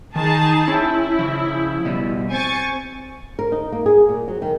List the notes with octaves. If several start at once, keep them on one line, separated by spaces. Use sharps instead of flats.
D#3 D#4 G#4 A5
C#4 E4 G5
C#3 F3
B2 G3
C4 G#5 C#6 A6
A#4
D#4
A#3
G#4
A#2
F#3
D#3